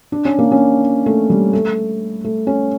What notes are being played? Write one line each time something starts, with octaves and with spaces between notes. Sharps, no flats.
D4
C#4
A#3
C#4
A3
G3
A3
A3
C#4